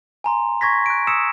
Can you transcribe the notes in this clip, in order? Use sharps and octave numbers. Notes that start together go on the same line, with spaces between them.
G#5 A#5 C6
C#6 G#6 A#6 B6
F#6 D7
D#6 E6 B6 C#7 E7